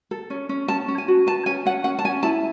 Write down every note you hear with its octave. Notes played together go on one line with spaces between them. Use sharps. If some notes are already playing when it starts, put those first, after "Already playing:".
A4
C#4
C#4
C#4 A5
C#4
G#5
F#4
B4 A5
C#4 G#5
C#4 F#5
C#4 F#5
A5
C#4 G#5
E4 A5